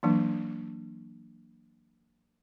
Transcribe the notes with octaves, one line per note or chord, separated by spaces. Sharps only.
E3 F#3 A#3 D4